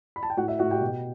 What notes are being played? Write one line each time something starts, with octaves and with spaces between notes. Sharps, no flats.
B5
A5
G5
A2 F#4 F#5
E5
A2 F#4 F#5
G4 G5
B2